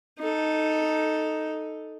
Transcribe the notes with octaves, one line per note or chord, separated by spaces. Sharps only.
D#4 A4